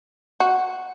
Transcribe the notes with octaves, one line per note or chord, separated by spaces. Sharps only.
F#4